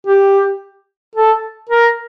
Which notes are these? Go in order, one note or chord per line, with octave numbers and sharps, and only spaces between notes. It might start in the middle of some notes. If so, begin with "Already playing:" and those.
G4
A4
A#4